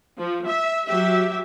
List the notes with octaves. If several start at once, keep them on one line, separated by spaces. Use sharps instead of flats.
F3
E5
F#3 G4 E5